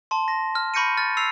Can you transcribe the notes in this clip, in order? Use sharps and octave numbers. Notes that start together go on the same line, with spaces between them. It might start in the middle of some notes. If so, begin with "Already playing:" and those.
A5 C6
A#6
F6
B5 C#6 G6 A#6 C#7 D#7
F6 A6
E6 A6 C7 F7